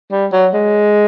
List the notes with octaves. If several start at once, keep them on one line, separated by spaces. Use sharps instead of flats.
G3
F#3
G#3